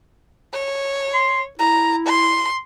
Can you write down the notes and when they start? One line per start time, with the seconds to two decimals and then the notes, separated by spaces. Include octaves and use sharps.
0.54 C#5
1.14 C6
1.59 E4 A#5
2.07 C6